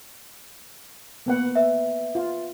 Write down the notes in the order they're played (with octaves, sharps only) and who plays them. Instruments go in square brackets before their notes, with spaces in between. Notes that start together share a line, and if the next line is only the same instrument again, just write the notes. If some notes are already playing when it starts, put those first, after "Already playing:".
[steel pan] A#3 B3 F#5
[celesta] B4 E5
[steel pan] F4